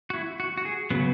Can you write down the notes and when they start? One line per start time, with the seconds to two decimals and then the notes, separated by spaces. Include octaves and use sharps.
0.10 F#4
0.13 E4
0.40 F#4
0.57 F#4
0.65 G#4
0.90 C#3 F#3 B3